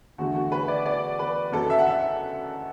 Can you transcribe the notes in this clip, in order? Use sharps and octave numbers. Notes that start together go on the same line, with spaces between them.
E2 D3 A3 F#4
F#4
B4
D5
D5
B4
F#1 F#2 F#3 A4
E5
F#5
E5